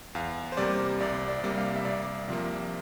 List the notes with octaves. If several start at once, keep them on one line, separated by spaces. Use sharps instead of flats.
E2 F5
C5
C3 G3 A#3 D5
C2 D5
D5
C3 G3 A#3
F5
E5
C2 D5
C3 F3 A#3